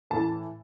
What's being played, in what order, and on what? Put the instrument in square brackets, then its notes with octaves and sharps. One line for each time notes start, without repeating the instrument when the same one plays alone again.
[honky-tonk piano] A2 E3 A3 A5